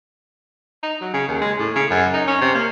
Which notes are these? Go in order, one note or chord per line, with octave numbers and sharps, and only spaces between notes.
D#4
F#3
C#3
D#2
G#3
A2
C#3
F#2
D#4
C#4
C3
A#3